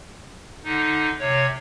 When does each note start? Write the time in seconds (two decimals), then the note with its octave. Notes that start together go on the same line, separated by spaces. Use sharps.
0.64 D3 D#4
1.20 C3 C#5